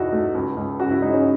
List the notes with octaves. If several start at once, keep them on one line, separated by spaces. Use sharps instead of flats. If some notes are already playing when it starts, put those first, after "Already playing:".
Already playing: E2 B2 D#4 E4 F#4
A3
C#2
C#2
C#3 F#4
E4
G#3 D#4
C#4